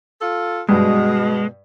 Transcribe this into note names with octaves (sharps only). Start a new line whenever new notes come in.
F4 A4
G2 B2 G#3